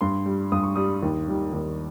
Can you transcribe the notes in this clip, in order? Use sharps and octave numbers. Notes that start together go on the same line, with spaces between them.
G2 C6
G3
G2 D#6
C#6
G3 D#6
D#2
D#3 G3
D#2